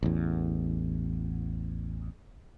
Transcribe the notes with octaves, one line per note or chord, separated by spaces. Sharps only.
A1 E2